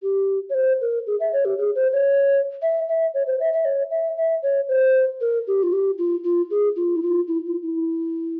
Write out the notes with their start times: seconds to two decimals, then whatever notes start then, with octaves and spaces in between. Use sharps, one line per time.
0.03 G4
0.50 C#5
0.54 C5
0.81 A#4
1.07 G#4
1.20 E5
1.33 C#5
1.45 G4
1.58 G#4
1.76 C5
1.93 C#5
2.62 E5
2.88 E5
3.14 C#5
3.27 C5
3.40 E5
3.53 E5
3.65 C#5
3.91 E5
4.17 E5
4.43 C#5
4.68 C5
5.21 A#4
5.47 G4
5.63 F4
5.73 G4
5.98 F4
6.24 F4
6.51 G#4
6.76 F4
6.96 E4
7.03 F4
7.28 E4
7.46 F4
7.63 E4